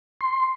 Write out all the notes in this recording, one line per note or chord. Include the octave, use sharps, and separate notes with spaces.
C6